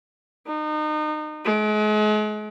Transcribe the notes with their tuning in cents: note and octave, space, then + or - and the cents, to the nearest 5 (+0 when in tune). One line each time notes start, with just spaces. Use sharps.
D#4 -30
G#3 +40